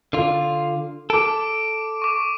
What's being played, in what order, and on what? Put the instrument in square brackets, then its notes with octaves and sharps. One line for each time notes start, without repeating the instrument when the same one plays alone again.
[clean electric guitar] D3 F4
[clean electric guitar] A4 [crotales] D6 D7
[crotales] C#6 D6